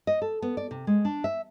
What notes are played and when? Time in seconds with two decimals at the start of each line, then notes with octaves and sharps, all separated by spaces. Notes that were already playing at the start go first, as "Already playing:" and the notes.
0.07 D#5
0.22 A4
0.42 B3
0.57 D5
0.71 C3
0.87 G#3
1.05 D4
1.24 E5